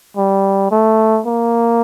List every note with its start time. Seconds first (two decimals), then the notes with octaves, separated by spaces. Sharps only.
0.17 G3
0.71 A3
1.26 A#3